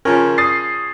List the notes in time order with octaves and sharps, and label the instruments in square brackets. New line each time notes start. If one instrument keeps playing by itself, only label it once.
[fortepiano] C#3 F3 C#4 [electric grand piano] A#4
[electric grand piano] D#6 A6 C7